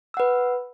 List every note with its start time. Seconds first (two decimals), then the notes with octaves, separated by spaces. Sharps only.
0.14 E6
0.17 F#5
0.20 B4